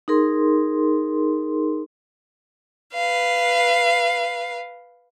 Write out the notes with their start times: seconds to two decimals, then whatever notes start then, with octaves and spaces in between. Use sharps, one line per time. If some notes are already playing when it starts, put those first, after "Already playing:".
0.08 D#4 G#4 A#4 C6
2.94 B4 F5